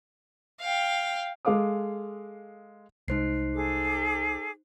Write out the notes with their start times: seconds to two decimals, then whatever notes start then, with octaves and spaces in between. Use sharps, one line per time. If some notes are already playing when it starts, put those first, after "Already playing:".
0.61 F5 G5
1.45 G#3 A4 F5 D6 D#6
3.08 C2 G#3 D#4 C5 C7
3.53 G#4 A4 D6